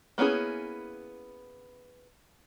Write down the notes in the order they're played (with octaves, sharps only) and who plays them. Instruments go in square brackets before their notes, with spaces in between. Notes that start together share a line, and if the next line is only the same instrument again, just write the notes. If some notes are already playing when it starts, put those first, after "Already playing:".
[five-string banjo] A#3 B3 C#4 E4 G#4